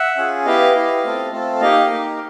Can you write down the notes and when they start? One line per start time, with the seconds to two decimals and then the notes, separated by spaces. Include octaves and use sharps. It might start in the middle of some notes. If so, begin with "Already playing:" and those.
Already playing: E5 F#5
0.17 C#4 F4 G#4
0.45 B3 E4 G4 D#5 F5
0.74 B3 E4 G4
1.04 A3 C4 F4 A4
1.32 A3 C4 F4 A4
1.61 A#3 D#4 G4 D#5 F5
1.90 A#3 D#4 G4